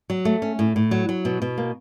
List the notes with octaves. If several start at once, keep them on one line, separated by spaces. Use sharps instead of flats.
F#3
A3
C#4
A2
A2
F#3
F#3
B2
B2
A#3